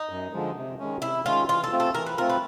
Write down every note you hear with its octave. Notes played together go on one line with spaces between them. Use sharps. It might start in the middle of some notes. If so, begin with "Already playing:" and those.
Already playing: D#4
F#2
D3 F3 G#3
C3
D#3 G#3 C#4
C3 E4
D#3 G#3 C#4 F4
E3 F4
A4
A3 C4 F4
A4
E3 A#4
B4
A3 C4 F4 A#4
B4